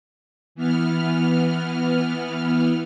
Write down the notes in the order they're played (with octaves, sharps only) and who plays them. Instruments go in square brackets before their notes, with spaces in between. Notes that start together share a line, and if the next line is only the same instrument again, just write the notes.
[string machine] E3 B3 F6